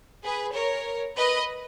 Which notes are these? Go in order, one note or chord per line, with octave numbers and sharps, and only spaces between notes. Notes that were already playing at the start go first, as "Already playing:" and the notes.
G#4 B4
A#4 C#5
B4 D#5